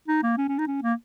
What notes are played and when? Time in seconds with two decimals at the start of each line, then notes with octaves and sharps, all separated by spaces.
0.08 D#4
0.23 A#3
0.38 C#4
0.48 C#4
0.58 D#4
0.67 C#4
0.83 A#3